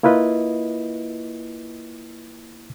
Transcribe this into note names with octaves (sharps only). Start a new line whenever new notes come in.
A#3 E4 F4 B4 D#5